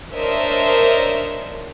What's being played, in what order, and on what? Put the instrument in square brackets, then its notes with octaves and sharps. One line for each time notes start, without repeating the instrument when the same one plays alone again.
[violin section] D4 A#4 C5 C#5 D#5 E5